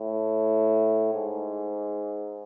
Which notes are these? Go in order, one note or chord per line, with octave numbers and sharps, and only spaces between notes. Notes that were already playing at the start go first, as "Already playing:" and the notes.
Already playing: A2
G#2